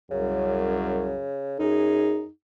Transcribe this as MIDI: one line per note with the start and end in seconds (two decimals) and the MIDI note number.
0.11 1.15 36
0.11 1.28 42
0.11 1.57 49
1.60 2.26 42
1.60 2.30 63
1.60 2.23 68